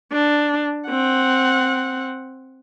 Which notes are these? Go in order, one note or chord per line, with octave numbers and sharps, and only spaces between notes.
D4
C4 F#5